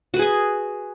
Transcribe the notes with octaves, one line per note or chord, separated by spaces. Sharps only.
F#4 G#4 B4 G#5